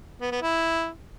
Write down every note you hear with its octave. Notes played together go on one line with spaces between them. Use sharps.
B3
B3
E4